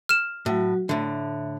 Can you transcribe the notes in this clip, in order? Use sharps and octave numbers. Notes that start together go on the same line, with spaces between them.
F6 E7
A2 F#3 F#4
A2 D3 E5